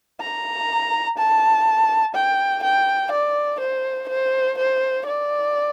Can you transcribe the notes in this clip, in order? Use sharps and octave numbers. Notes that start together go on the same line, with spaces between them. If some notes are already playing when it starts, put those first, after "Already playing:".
A#5
A5
G5
G5
D5
C5
C5
C5
D5